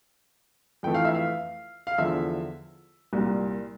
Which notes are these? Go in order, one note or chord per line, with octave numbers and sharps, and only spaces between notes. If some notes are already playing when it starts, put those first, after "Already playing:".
F2 E3 A3 G5
F5
E5
F5
F5
E2 D3 F3 E5
C2 A#2 G3